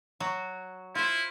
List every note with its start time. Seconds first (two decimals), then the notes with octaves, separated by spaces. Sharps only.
0.20 F#3 F#4
0.95 E4 F4 C5